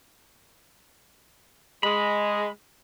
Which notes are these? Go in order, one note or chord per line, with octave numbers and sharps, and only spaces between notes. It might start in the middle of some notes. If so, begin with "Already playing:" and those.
G#3 B5